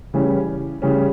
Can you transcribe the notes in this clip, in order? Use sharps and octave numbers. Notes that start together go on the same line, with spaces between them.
C#3 E3 G3 C#4
C#3 E3 G3 C#4